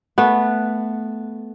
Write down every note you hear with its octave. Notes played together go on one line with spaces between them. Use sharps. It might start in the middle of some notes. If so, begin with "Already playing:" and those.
A3 B3